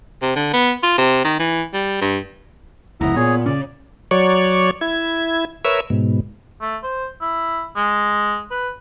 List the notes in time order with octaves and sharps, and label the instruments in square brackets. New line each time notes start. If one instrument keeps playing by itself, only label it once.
[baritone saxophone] C3
D3
B3
F4
C3
D#3
E3
G3
G2
[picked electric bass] F1 C#2 [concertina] B3 A#5 [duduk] E4
[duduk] A#2 [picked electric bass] B3 [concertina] G#4 C#5
[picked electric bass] C#3 C#4 [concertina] D5
[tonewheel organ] F#3 C#5 D5 C#6
E4 G#6
A#4 B4 C#5 E5 E6
G#2 B2
[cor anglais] A3
C5
E4
G#3
B4